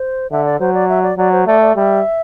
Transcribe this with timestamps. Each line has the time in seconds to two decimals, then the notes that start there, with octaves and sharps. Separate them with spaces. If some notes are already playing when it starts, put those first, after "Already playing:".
Already playing: C5
0.31 D3 E5
0.45 D5
0.60 F#3 C5
0.74 D5
0.89 E5
1.03 D5
1.18 F#3 D5
1.32 C5
1.47 A3 D5
1.61 D5
1.76 G3 E5